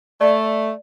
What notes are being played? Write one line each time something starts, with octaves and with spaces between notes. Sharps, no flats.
A3 D5